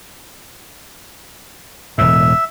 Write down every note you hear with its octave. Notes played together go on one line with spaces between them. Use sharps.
E1 A2 E5